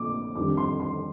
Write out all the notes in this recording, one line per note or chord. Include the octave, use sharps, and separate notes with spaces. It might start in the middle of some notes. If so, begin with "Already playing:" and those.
Already playing: A#1 A#2 A3 D4 D6
F2 D#3 G3 D4 D6
C6
C6